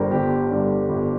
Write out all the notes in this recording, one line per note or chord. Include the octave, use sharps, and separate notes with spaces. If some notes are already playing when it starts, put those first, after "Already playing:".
Already playing: G1 G2 D3 G3 A#4 C5
G1 G4
G2 D3 G3
G1